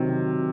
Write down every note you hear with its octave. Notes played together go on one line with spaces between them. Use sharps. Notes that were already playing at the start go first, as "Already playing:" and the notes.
Already playing: C3 D#3 F#3